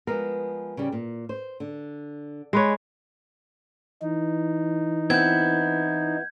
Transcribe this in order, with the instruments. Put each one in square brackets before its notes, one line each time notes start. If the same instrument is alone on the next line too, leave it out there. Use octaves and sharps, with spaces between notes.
[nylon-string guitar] F3 G#3 B3 [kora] A#4
[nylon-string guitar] C#3 G3
A#2
C5
D3
[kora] G#3 B4 C#5
[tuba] E3 [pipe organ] D#4
[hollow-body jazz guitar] B3 C4 E4 [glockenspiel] G6 G#6